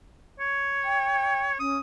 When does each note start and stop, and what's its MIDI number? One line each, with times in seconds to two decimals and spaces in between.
0.40 1.57 73
0.85 1.46 79
1.60 1.76 61
1.60 1.79 87